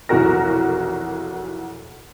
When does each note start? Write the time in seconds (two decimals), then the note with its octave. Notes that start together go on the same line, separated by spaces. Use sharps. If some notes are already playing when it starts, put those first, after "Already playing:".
0.09 F1 B1 E3 F#4 A#4 A#6